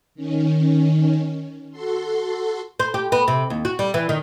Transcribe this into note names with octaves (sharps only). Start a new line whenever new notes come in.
D#3 C#4
F#4 A4 C6
C5
G4
B3
C3
D#2
F#4
G3
E3
D#3